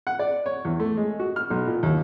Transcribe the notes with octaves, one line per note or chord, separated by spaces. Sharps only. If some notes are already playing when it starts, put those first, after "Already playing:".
F#5
D5
C#5
E2
A3
G#3
F#4
F6
B1
A#2
D#2